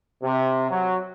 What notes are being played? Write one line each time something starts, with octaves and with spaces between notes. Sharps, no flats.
C3
F#3